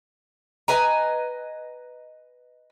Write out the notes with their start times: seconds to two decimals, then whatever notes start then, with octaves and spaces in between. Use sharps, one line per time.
0.68 B4 D#5 G#5 A#5